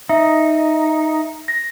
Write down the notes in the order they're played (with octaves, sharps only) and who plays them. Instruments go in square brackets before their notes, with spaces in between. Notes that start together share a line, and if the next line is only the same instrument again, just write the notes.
[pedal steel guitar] D#4 [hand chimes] E5
[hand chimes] A#6